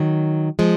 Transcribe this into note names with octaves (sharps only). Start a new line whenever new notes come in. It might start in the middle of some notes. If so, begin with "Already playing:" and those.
Already playing: D#3 F#3
F3 G#3